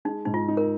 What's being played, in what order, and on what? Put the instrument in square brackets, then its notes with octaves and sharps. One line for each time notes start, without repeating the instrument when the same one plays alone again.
[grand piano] G#3 [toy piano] D#4
[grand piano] G#2 [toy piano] D#4
[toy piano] F4
[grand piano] D#4
[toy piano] A#4